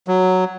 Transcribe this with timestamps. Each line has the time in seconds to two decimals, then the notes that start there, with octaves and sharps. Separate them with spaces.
0.08 F#3